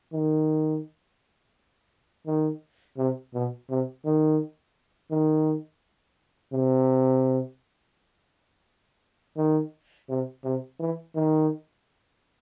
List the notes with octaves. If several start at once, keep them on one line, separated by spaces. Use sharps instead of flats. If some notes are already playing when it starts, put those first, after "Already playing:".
D#3
D#3
C3
B2
C3
D#3
D#3
C3
D#3
C3
C3
E3
D#3